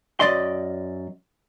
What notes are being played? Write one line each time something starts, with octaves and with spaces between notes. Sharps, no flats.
F#2 D5 D#5 C6